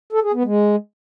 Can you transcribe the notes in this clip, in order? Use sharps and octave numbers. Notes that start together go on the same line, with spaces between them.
A4
G#4
B3
G#3